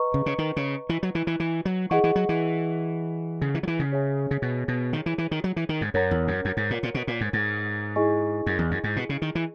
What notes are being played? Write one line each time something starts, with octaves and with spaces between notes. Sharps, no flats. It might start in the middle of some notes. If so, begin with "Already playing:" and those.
Already playing: B4 D#5 A#5 C#6
C#3
C#3
D#3
C#3
E3
F#3
E3
E3
E3
F#3
E3 G#4 D#5 F#5 C#6
E3
F#3
E3
C#3
E3
F#3
E3
C#3
G#4 C#5 E5 G#5
C#3
B2
B2
D#3
E3
E3
D#3
F#3
E3
D#3
G#2
F#2 A#4 C#5 F#5 A#5
E2
F#2
F#2
G#2
A#2
A#2
B2
A#2
G#2
G#2
E4 G#4 D#5 G#5 C#6
F#2
E2
F#2
G#2
B2
C#3
D#3
E3